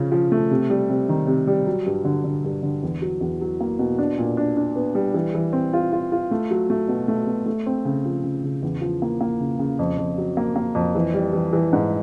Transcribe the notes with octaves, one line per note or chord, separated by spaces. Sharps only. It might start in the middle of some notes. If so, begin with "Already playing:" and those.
Already playing: C#3 F3 C#4
F3
A3
C3
G3
C3
D#3
C3
G3
F#3
G2
D3
D3
G2
D3
E2
F#3
E2
F#3
A#3
B2
D4
A#2
D4
D4
B3
G3
E3
E3
C4
F4
F4
F4
A3
F#3
A3
B2
A3
B2
A3
C4
C#3
F3
C#3
C#3
E2
F3
A#3
A#3
C#3
C#3
F2
F2
F#3
A#3
A#3
F2
E3
G3
E3
E3
G#2